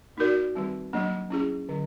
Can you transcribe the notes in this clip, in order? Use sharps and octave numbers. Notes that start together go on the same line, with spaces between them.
A#3 D#4 F#4 A#4 D5
D#3 G3 C4
F#3 A#3 D4
C#4 E4 G#4
D3 F#3